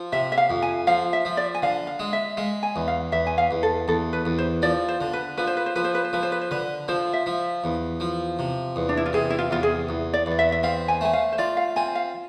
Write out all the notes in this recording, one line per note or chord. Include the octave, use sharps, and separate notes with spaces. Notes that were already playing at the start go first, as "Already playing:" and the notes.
Already playing: F3
C3 E5
E5
F5
F2
G#5
F3 F5
E5
F3
D5
G#5
D3 F5
F5
G#3
E5
G#3 F5
G#5
E2
F5
E2 E5
G#5
F5
E2
A4
E2 A4
B4
E2
C5
F3 D5
C5
D3
B4
F3 B4
C5
B4
C5
F3 B4
C5
B4
C5
F3 B4
C5
B4
C5
D3 B4
F3 C5
E5
F3
E2
F3
C3
E2
D4
E4
F4
C3 G#4
E4
F4
E2 F4
G#4
E2
D5
E2 D5
E5
E5
C4 F5
G#5
A3 G#5
F5
C5
F4 D5
F5
C4 G#5
F5